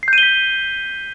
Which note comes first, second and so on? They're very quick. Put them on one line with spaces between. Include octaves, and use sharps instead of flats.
C7 G6 D#7 G7 B6